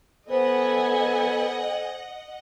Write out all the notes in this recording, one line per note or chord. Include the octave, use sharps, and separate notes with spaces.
B3 A4 C5 D#5 F#5 G#5